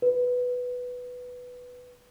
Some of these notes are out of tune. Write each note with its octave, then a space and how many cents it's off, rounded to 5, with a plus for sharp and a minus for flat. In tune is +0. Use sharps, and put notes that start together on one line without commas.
B4 +5